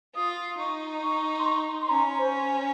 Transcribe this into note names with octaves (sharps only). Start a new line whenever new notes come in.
F4 D#6
D#4 C#6
C#6
C6
C#6
C6
C#4 A#5
C5